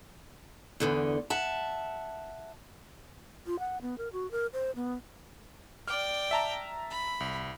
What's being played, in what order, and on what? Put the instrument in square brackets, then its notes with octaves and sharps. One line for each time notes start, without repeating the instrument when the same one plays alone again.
[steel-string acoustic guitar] E2 D3 B3
E5 F#5 A5
[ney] F4
F#5
B3
A#4
F#4
A#4
C5
B3
[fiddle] D5 G5 [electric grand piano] D6 F6
[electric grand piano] E5 A5 A#5
[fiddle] B5
[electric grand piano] C2